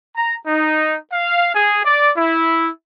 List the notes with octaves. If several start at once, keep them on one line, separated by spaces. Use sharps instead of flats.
A#5
D#4
F5
G#4
D5
E4